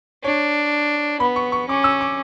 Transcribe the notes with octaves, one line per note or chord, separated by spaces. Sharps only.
D4 C#5
B3 B5
C#6
C#6
C#4 D6
E6
D6